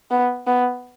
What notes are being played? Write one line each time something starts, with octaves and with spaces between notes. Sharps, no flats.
B3
B3